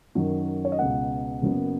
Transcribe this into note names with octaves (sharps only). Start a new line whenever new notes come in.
F#2 D#3 F#3
C#5
D#5
C#2 B2 B3 F#5
F#1 F#2 F#3 B3